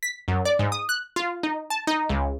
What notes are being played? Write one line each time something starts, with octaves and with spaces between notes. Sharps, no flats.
B6
F#2
D5
G#2
D#6
F#6
F4
D#4
A5
D#4
C#2